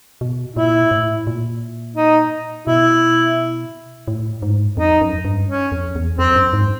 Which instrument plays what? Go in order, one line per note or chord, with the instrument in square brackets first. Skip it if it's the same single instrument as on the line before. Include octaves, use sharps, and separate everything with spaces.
[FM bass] B2
[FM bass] A#2 [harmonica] E4
[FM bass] A2
A#2
[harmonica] D#4
[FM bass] B2 [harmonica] E4
[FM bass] A2
G#2
[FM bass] F2 [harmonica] D#4
[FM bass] F#2
G2
[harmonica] C#4
[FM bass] F2
E2
[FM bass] F2 [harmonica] C4
[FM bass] F#2
G#2